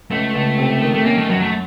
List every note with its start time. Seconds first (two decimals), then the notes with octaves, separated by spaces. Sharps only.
0.11 C#2 A3
0.35 C#2
0.58 C3
0.82 D#3
0.94 A3
1.05 A#3 C#4
1.18 A3
1.29 F#2 F#3
1.42 A3